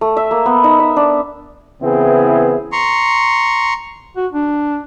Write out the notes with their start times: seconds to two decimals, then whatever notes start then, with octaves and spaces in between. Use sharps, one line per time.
0.01 A3
0.17 E5
0.31 A#3
0.46 B3
0.64 D#4
0.80 E5
0.96 D4
1.82 C#3 E3 B3 C4 E4 G#4
2.72 A#5 C6 C#6
4.17 F#4
4.32 D4